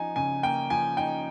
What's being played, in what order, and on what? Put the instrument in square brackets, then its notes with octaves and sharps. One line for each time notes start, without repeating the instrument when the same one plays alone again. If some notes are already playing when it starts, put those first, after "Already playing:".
Already playing: [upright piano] F3 D#4 G#5
C#3 G#5
A#3 G5
F3 G#5
D#4 G5